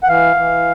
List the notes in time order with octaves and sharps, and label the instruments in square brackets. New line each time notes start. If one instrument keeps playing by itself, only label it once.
[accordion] F#5
E3 F5
E3